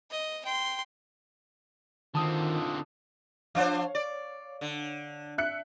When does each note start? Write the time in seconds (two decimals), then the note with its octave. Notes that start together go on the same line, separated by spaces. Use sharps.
0.11 D#5
0.45 G5 C6
2.15 D3 D#3 C4 D#4 F4 A5 D#6
3.55 F3 D4 C5 C#5 F5
3.95 D5
4.61 D3
5.38 E5 F#6 C#7